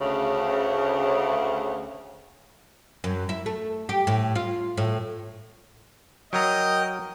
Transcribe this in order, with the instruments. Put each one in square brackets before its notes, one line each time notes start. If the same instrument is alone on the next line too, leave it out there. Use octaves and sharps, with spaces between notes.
[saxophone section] D2 C#3
[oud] F#2
E4
A3
G4
A2
F4
A2
[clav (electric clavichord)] F#3 A#5 [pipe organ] A#4 G5 [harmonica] D#5